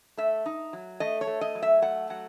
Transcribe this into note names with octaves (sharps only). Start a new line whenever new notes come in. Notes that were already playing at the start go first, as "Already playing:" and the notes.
A3 E5
D#4
F#3
A3 D#5
C#5
A3
D#5
F#3
E5
A3 F#5
F#3 F#5